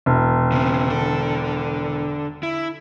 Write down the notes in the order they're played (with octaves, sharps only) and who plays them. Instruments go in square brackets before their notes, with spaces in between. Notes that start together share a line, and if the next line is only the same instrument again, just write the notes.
[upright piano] E1
[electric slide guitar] C#3 C4
D3 A4
E4